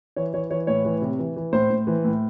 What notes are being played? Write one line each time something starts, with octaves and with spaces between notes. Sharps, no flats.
E3 C#5
E3 C#5
E3 C#5
A2 C#5
E3
C3
E3
E3
A2 C5
A2
E3
A2